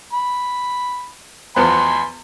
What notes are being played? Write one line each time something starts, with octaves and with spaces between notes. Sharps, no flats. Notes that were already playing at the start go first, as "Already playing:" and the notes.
B5
E2 F3 B3 G#5 B5 C6